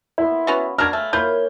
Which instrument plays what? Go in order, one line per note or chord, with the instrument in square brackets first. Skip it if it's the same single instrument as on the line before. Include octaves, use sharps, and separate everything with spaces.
[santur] B3 C6 [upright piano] E4
[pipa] B3 C#4 F#4 [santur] F5
[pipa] D4 F#4 A#4 [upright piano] F6 G#6
[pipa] A3 [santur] F5 G#5
[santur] A#3 C#5 F5 [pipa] E4 F4 [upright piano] G6